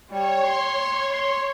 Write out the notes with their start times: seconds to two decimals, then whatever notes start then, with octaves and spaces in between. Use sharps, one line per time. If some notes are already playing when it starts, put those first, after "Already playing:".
0.10 G3 C#5
0.46 C6
1.12 C6